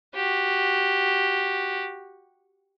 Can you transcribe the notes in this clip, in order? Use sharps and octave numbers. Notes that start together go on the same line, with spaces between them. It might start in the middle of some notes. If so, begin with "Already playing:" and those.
F#4 G4